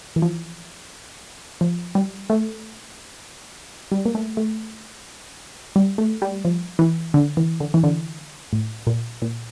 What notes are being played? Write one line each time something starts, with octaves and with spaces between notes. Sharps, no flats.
E3
F3
F3
G3
A3
G3
A#3
A3
A3
G3
A3
G3
F3
E3
D3
E3
D3
E3
D3
A2
A#2
A#2